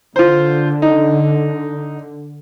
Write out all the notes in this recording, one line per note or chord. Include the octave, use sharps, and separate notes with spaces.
D3 F4 C5
D#4